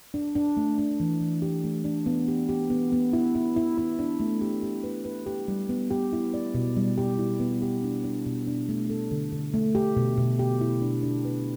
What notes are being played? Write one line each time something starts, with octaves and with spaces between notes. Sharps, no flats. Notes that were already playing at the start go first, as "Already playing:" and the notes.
D4
D4
A3
D4
E3
E3
G4
A3
D4
B3
G4
G4
B3
B3
E4
E4
E4
E4
D4
A3
G4
G4
B4
B4
G4
G3
B3
G4
E4
D5
B2
G3
G4
E4
B3
G4
D4
D4
B2
D4
A3
A4
D3
D3
A3
G4
B2
B2
G4
E4
D4
D4
B4